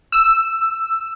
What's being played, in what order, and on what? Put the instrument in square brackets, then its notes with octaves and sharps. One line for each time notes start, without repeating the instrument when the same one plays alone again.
[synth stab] E6